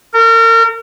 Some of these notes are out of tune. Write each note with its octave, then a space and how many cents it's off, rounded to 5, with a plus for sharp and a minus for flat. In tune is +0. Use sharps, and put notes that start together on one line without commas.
A#4 -35